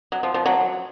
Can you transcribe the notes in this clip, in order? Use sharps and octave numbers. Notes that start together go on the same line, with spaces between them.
F#3
F3
F3
F#3